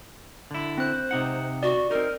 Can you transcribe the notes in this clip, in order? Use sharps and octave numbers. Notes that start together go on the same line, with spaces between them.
D3 E4
C4 C5 F#6
C3 D#4 F#5
F#4 D5
C4 D#4 A#4